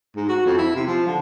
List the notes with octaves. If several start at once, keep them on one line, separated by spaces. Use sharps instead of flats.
G#2
F#4
F2
E4
C3
F3
D3